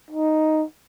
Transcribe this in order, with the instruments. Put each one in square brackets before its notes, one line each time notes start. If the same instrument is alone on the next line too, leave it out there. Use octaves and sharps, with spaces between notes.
[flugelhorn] D#4